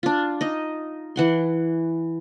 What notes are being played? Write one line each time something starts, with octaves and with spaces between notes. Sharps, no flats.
D4 F4
D#4 D#5
E3 F#5 C6